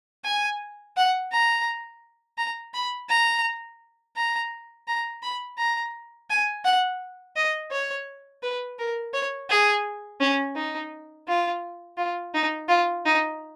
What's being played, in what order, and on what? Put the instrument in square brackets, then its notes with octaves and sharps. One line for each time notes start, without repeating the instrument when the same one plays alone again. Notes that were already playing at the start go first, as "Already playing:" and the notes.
[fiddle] G#5
F#5
A#5
A#5
B5
A#5
A#5
A#5
B5
A#5
G#5
F#5
D#5
C#5
B4
A#4
C#5
G#4
C#4
D#4
F4
F4
D#4
F4
D#4